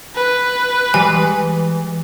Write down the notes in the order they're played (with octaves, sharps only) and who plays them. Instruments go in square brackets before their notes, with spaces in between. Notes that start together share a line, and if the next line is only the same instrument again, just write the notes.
[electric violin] B4
[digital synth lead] E3 [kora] G3 G#3 [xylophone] G#5